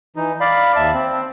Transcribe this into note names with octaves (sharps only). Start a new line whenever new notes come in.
E3 D#4
D5 F5 B5
D#2 E5 A5
C4